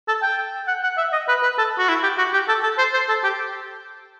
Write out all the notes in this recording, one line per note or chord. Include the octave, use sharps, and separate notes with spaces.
A4
G5
F#5
F#5
E5
D#5
B4
B4
A4
F#4
E4
G4
F#4
G4
A4
A4
C5
C5
A4
G4